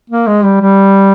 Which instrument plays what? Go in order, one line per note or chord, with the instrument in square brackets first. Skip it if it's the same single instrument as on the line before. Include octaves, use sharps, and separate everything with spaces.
[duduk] A#3
G#3
G3
G3